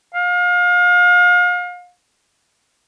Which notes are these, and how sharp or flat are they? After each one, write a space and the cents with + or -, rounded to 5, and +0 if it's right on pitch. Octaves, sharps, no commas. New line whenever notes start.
F5 +35